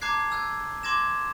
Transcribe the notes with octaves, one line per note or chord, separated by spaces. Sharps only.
A5 A#5 D6 F#6 G#6 C7
G#5 E6 F#6 G#6
C6 D6 G#6 A#6 E7